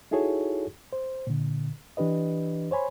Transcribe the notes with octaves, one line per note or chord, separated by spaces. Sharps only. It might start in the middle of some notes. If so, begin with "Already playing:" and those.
D#4 E4 F#4 G#4 A4 C#5
C5
A#2 D3
E3 D4 G4 B4 D#5
C5 C#5 G#5 B5 C6